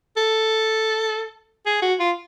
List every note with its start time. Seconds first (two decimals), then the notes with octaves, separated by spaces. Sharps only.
0.17 A4
1.66 G#4
1.82 F#4
1.99 F4